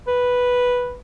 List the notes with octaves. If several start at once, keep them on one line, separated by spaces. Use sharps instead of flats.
B4